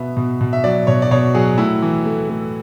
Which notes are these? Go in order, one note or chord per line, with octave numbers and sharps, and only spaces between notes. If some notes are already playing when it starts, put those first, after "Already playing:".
Already playing: B2 B3 E5
B2
B2
E5
F#3 D5
B2 C#5
D5
B2 C#5
F#3 G#4
A2 E4
E3
A3
A3